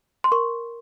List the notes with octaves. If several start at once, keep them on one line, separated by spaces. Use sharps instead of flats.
C6
A#4 C#6